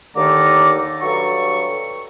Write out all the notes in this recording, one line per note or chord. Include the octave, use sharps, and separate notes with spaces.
D#2 D3 D#3 A3 A#5 D6
G2 F#3 A4 C#6